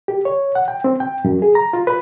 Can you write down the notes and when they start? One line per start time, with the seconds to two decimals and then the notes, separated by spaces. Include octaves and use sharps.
0.08 G4
0.25 C#5
0.55 F#5
0.68 G5
0.84 C4
1.00 G5
1.25 F#2
1.42 G#4
1.55 A#5
1.73 F4
1.87 B4